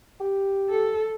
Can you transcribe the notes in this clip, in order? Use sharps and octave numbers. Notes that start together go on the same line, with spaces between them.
G4
A4